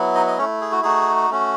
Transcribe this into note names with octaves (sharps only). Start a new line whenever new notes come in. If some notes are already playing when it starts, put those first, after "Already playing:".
Already playing: F#3 B3 E4
D#4 D#5
D#5
A3 C#4 E4 C#5
G#4
F#4
A3 D#4 F#4 G#4
A3 C#4 F#4